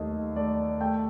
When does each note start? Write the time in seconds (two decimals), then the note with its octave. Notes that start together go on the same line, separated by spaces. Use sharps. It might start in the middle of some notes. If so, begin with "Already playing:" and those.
Already playing: D#2 D#3 A3 D#5
0.36 A3 D5
0.81 A3 G5